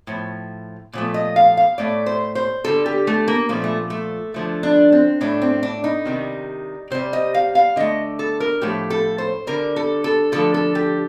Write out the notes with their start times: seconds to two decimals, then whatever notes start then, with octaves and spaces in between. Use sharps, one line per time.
0.07 A2 F3
0.93 A#2 F3 A3
1.14 D#5
1.36 F5
1.57 F5
1.78 A2 A3 D5
2.06 C5
2.35 C5
2.64 D3 G3 A4
2.86 G4
3.07 A3
3.28 A#3
3.49 A#2 F3 A3 A#3
3.64 A3
3.90 A3
4.34 D3 F3 A3
4.63 D4
4.92 C4
5.21 A2 A3 D4
5.42 C4
5.63 D4
5.84 D#4
6.05 C3 D#3 G3
6.90 C3 G3 C5
7.13 D#5
7.34 F5
7.55 F5
7.76 D3 A3 D#5
8.19 A4
8.40 A#4
8.62 A2 F3 A3 G4
8.90 A4
9.18 C5
9.47 D3 G3 A#4
9.76 A4
10.04 A4
10.32 D3 F3 A3 A4
10.54 A4
10.75 G4